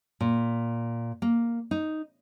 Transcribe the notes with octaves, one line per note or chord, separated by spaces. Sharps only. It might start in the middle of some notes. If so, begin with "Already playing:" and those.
A#2
A#3
D#4